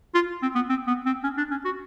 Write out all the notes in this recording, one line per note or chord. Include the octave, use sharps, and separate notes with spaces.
F4
C4
B3
C4
B3
C4
C#4
D4
C#4
F#4